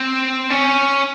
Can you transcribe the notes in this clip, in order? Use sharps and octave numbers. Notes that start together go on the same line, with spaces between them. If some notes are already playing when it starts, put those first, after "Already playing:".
Already playing: C4
C#4